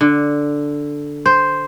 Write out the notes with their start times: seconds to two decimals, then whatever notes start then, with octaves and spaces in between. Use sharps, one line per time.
0.01 D3
1.26 C5